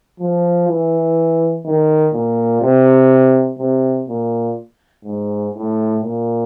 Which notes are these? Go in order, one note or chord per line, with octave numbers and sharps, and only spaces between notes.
F3
E3
D#3
A#2
C3
C3
A#2
G#2
A2
A#2